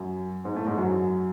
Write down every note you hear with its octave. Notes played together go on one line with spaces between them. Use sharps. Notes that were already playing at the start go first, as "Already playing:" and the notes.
Already playing: F#2 F#3
G#2 G#3
A2 A3
G#2 G#3
F#2 F#3